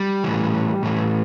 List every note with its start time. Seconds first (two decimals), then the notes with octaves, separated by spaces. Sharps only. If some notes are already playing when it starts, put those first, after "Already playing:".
Already playing: G3
0.24 A2 E3
0.83 A2 E3